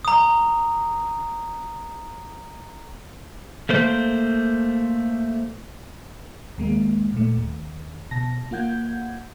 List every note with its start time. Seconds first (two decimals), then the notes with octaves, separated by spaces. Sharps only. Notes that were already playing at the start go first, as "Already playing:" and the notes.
0.05 A#5 D#6
3.69 A3 A#3 C5
6.58 D#2 G#3 A#3
7.13 A#2 A3
7.37 D#2
8.11 B2 A5 A#6
8.51 A#3 F4 F#5 G6 G#6